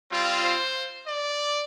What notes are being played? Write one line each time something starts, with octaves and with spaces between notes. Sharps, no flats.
G3 C4 F4
C5
D5